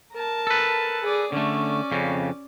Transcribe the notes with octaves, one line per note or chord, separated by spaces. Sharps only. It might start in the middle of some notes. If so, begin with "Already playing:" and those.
A#4 A5
A4 B4
G#4 D5
D3 A3 C#4 D5
F2 C#3